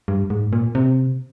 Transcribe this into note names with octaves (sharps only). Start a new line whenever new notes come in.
G2
G#2
A#2
C3